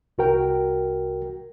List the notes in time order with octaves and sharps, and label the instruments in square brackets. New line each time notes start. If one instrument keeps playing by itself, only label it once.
[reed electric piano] C2 F#4 A#4 G5